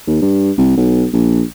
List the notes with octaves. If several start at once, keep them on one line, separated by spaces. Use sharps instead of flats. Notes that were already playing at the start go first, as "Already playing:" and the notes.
D#2
G2
C2
B1
A#1